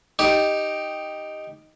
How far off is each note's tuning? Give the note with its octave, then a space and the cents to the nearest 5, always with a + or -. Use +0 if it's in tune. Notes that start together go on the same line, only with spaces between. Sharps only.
D#4 +0 G4 +0